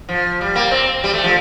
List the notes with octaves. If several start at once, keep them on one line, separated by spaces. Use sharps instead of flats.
F3
G3
A#3
C4
G3
A3
F3